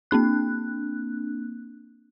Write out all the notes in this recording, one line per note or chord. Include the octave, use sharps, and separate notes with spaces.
A#3 C4 D4 F#6